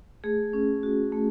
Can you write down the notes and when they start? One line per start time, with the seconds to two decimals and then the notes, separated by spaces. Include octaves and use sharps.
0.24 A3 G#4
0.53 C#4
0.83 F#4
1.12 A3